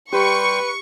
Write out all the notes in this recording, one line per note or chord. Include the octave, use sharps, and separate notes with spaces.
G3 G4 B4 G5 C6 C#6